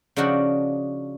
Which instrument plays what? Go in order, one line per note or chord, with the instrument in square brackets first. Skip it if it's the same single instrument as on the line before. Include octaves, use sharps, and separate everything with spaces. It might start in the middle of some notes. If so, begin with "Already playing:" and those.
[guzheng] C#3 F3 D4 D#4 F#4 F#5